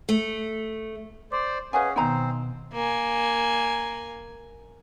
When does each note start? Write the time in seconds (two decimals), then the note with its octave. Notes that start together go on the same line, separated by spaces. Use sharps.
0.09 A3
1.32 C5 D5 D6
1.73 C#4 G#4 B4 D#5 F5 F#5 G#5
1.96 B2 D#3 B3 C4 D#4 C5 G#5 A#5
2.74 A#3 G#5